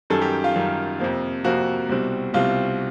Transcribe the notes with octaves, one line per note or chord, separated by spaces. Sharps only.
F#2 D#3 G3 A4
G4
F4
F#2 D#3 G3
F2 C3 F3 A#3
F2 C3 F3 A#3 F#4
C2 B2 G3 C4
C2 B2 G3 C4 F4